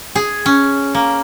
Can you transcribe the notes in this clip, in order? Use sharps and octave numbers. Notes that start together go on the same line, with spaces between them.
G#4
C#4
A#3